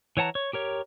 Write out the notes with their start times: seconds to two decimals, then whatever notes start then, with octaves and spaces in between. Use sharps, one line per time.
0.17 E3 C#5 F#5 A5 A#5
0.35 C#5
0.53 G4 A#4 C#5